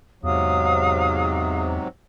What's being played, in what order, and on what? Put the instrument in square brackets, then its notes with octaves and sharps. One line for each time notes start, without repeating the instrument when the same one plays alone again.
[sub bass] E2 [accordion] G#2 C3 F#3 [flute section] F5 D#6